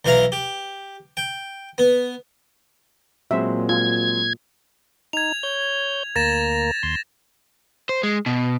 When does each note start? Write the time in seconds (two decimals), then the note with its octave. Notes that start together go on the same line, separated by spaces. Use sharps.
0.05 B1 E3 E4 F5 A#5
0.32 G4
1.17 G5
1.78 B3
3.31 A#2 F#3 G#3 C4 E5
3.69 F4 G#6
5.13 D#4 G#6 F7
5.43 C#5 G6
6.16 D2 A#3 A#4 A6 A#6 E7
6.83 D#2 C6
7.89 C5
8.03 G#3
8.26 B2